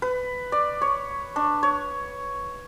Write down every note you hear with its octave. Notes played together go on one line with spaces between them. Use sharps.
B4
D5
C#5
D4
C#5